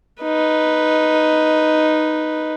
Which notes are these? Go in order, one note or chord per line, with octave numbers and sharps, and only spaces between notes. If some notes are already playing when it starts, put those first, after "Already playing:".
D#4 B4